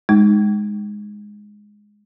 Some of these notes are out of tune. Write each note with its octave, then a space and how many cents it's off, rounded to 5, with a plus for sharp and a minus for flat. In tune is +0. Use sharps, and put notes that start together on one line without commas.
G#3 +0 D#4 +0